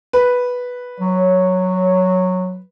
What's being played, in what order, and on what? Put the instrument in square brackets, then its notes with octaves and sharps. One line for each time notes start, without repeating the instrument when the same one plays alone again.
[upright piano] B4
[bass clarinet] F#3 [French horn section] C#5